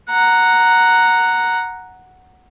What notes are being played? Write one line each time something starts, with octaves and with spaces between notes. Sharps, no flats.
F#5 A#5